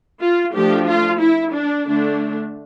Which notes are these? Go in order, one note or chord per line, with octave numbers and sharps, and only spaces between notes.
F4
F3 A3 D4 G4
F4
E4
D4
D3 A3 D4